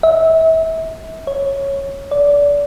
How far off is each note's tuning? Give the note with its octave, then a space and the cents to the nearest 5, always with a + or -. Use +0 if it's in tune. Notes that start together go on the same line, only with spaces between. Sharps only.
E5 -30
C#5 -5
D5 -25